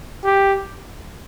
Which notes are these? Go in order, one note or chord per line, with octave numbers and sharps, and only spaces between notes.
G4